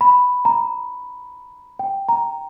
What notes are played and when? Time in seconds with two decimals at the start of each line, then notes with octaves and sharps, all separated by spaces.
0.01 B5
0.45 A#5
1.79 G5
2.09 A#5